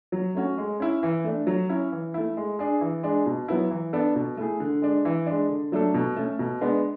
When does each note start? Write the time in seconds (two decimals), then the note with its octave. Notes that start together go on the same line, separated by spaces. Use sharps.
0.12 F#3
0.35 A3 C#4 F#4
0.58 G#3
0.80 C#4 E4
1.03 E3
1.24 A3 D4
1.47 F#3
1.69 C#4 E4
1.92 E3
2.14 A3 E4
2.37 G#3
2.59 D4 G#4
2.81 E3
3.03 G#3 D4 G#4
3.26 B2
3.48 F#3 B3 E4
3.70 E3
3.93 B3 D4 A4
4.15 B2
4.37 A3 E4 G#4
4.60 D3
4.82 G#3 D4
5.05 E3
5.26 G#3 D4
5.49 D3
5.72 F#3 A3 D4 A4
5.94 B2
6.16 A3 C#4
6.39 B2
6.61 G#3 B3 D4